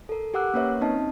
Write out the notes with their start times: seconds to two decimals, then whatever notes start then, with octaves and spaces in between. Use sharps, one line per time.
0.09 A4 A#4
0.34 G4 A#4 F#5 D6 E6 F#6
0.54 A#3 C#4 A#4 B4 C#5 E5
0.81 C4 C#4 D#4 D#5 A5